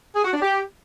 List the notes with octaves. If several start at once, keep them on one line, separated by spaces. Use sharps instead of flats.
G#4
F#4
D4
G4